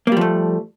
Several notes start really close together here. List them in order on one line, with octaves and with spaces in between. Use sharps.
A#3 G3 F3 A3